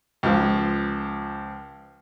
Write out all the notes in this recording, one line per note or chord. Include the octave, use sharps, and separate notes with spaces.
C#2 F3